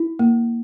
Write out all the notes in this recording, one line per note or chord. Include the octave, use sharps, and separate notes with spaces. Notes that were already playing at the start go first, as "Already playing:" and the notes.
Already playing: E4
A#3